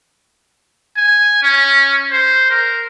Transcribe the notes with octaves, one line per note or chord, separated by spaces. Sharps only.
G#5
C#4
C5
A#4